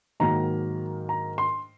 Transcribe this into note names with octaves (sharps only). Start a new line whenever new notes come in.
G#2 D#3 F#3 A#3 A#5
A#5
C6